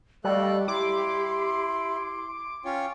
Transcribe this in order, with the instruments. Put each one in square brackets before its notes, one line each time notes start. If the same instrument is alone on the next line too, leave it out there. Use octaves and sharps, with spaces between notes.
[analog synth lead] G3 [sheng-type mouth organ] A3 A4 F#6 [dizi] G4 [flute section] D5 D#5 F5
[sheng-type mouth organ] E4 [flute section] C6 [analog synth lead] D6
[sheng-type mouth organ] C#4 F4 C#5 [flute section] G5